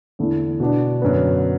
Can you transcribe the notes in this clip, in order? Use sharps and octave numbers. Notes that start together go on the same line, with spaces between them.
E2 D3 A3 E4
B2 B3 D4 F#4
F#2 D3 B3